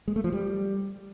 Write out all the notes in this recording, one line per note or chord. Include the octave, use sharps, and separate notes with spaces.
G#3
A3
F3
G3